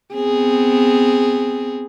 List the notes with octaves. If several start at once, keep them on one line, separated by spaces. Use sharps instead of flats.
B3 C4 G#4